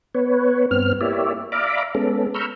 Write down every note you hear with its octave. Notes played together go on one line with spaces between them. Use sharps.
B3 B4 C#5
G2 B3 C4 F6
A#3 E4 G4 C#5 D5 E5
D5 E5 F5 A#5 B5 D6
G#3 B3 C#4 A4
A#5 B5 C#6 E6 F6 G6